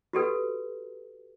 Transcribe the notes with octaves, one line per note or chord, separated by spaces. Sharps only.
F#4 G4 A4 B4